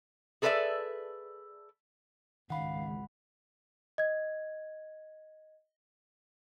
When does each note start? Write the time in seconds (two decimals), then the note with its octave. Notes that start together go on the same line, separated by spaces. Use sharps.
0.42 G#4 A4 B4 C5 D5 E5
2.50 G#1 C#2 D#3 F5 F#5 B5
3.98 D#5 G#6